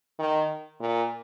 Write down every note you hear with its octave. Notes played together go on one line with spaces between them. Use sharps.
D#3
A#2